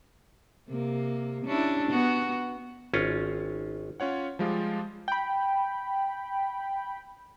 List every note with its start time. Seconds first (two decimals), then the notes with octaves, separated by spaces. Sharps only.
0.68 C3 A#3
1.44 C#4 D4 E4
1.90 B3 F#4
2.93 G#1 C#4 F4
4.00 C#4 F4 C#5 F#5
4.39 F3 G3 G#3 F4 G4
5.08 G5 B5